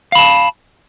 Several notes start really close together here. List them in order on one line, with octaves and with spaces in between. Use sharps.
F5 B5 A5